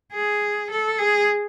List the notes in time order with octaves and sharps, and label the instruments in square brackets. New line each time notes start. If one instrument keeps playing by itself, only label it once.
[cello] G#4
A4
G#4